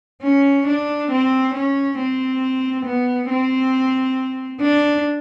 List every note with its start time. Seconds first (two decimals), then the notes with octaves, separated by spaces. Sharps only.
0.22 C#4
0.67 D4
1.11 C4
1.54 C#4
1.99 C4
2.85 B3
3.30 C4
4.61 D4